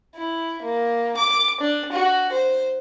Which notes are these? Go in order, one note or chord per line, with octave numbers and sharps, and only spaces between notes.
E4
A#3
D6
D4
F#4
C5